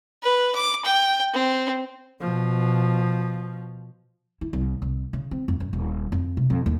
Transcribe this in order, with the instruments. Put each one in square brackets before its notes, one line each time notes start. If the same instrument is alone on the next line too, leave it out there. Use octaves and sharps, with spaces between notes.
[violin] B4
D6
G5
C4
[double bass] B2 F3
[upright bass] E4
C2
C2
C#3
C4
F2
F#2
D#1
F2
C3
F2
D#2